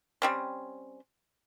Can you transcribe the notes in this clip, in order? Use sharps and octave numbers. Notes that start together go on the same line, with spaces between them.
G3 C4 C#4